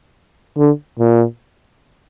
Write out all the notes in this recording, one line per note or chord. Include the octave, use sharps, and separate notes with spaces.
D3
A#2